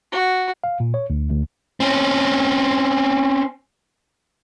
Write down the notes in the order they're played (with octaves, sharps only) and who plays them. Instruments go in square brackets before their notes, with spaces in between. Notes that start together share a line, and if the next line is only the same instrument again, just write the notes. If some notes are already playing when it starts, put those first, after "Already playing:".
[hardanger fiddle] F#4
[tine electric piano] F5
A#2
C#5
D2
D2
[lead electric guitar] C4 C#4